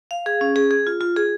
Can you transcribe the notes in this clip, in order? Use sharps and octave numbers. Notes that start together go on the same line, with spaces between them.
F5
G#4
C#4
G#4
G#4
F4
F4
G#4